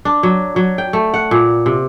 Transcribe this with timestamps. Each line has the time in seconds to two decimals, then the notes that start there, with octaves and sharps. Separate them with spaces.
0.05 D4
0.23 F#3
0.56 F#3
0.78 G5
0.93 A3
1.14 F#5
1.31 A#2
1.66 C3